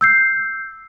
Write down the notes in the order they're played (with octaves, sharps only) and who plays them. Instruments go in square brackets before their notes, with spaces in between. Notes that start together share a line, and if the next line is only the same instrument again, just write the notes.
[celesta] E6 G6 C7